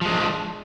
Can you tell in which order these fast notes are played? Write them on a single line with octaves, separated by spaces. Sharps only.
F3 G#3 D4